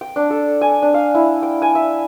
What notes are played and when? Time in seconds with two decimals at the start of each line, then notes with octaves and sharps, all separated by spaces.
0.01 G5
0.16 D4
0.30 A4
0.61 G#5
0.82 D4
0.94 F5
1.15 E4
1.43 G5
1.62 G#5
1.75 E5